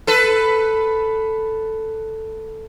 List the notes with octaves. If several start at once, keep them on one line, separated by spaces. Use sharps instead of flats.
A4 B4